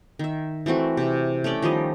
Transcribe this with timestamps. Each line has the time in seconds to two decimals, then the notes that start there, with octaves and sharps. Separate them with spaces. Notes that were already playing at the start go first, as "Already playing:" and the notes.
0.19 D#3 E5
0.66 E3 A3 C4 F#4
0.97 C3
1.44 A3 C#4 D5 G5
1.62 D#3 F3 G3 D#5